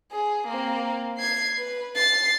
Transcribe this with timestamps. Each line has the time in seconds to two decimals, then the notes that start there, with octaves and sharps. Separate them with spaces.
0.12 G#4
0.47 A#3 C4
1.18 G#6 C7
1.58 B4
1.95 A6 C7